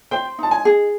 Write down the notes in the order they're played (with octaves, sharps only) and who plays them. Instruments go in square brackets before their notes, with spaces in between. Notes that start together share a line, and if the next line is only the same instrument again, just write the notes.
[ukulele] C5 [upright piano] G5
[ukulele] D#4 [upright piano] A5
[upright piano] G#5
[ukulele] G#4